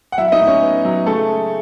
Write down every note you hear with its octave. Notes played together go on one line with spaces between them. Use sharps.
F#5
F#3 E4 E5
E5
D#4 D#5
A2
C#4 C#5
B3
F#3
C#3 A3 A4
G#3